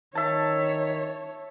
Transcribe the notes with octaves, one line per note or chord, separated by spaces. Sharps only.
D#3 C#5 E5 A5